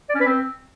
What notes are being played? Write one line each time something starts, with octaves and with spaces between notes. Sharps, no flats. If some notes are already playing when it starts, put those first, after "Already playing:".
D5
C#4
B4
C4